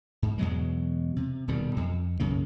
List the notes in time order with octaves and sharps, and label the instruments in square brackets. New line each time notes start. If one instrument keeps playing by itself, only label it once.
[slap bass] G#2
E2 B2 F#3 G#3
C3
D#1 B2 D#3 G3
F2
B1 F#2 C#3 A#3